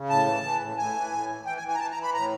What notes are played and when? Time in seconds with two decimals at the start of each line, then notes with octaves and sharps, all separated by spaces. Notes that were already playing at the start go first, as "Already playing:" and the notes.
Already playing: C#3
0.09 A2 A5
0.27 E3
0.43 E3
0.60 A2
0.77 A2 G#5
0.94 E3
1.11 A2
1.28 E3
1.45 E3 G5
1.57 G#5
1.62 E3
1.68 G#5
1.75 A#5
1.79 E3 A5
1.91 A#5
1.96 E3
2.02 B5
2.13 A2 A#5